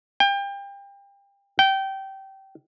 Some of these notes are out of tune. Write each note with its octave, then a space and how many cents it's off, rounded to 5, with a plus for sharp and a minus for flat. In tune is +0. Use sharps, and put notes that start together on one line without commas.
G5 +30
G5 -20